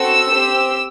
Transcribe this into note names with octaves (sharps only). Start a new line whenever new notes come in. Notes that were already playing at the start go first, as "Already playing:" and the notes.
Already playing: C4 F#4 A4 E6
C4 G4